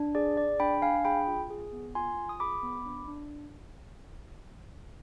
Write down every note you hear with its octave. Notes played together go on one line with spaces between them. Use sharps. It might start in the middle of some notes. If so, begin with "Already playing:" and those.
Already playing: D4
G#4 D5
G#4 D5
D4 G5 B5
D4 F5 G#5
G#4 G5 B5
F4
G#4
B3
F4 G#5 C6
F4
D#6
G#4 B5 D6
B3
D4
D4